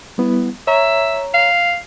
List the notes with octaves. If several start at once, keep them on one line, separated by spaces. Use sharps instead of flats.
G3 B3 E4
C#5 E5 A#5
F5